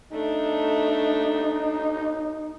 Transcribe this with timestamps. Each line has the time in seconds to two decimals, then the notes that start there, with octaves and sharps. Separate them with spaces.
0.12 A3 D4 D#4